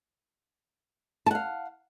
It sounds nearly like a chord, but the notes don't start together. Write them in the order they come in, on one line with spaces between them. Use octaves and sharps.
A5 F#5 F5